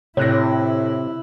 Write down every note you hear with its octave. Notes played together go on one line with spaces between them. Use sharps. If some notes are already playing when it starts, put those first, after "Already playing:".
A2 C3 E4 C#5 F#6 A#6